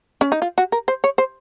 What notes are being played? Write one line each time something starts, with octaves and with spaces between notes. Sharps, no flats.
C#4
D#4
F4
F#4
A#4
C5
C#5
C5